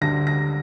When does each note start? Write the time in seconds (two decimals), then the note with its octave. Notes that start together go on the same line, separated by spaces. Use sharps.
0.01 D2 D3 G3 A#6
0.27 A#6